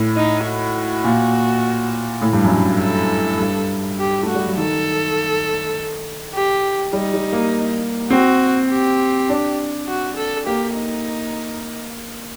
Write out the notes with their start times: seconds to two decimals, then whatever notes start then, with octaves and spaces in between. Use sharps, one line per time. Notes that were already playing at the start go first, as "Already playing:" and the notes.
Already playing: A2
0.16 D#4
0.46 F#4
1.04 A#2
2.22 A2
2.33 G2
2.44 F#2
2.55 G2
2.81 A4
3.40 G2
3.99 G4
4.23 A3
4.29 F#4
4.34 G3
4.46 F#3
4.57 D#3 A4
6.34 G4
6.93 G3 D#4
7.13 G3
7.33 A#3
8.10 C4 F#4
8.70 G4
9.29 D4
9.88 F#4
10.17 A4
10.46 A#3 G4
10.76 D#4